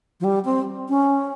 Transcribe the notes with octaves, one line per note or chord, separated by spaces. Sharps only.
F3
G3
C4
C#4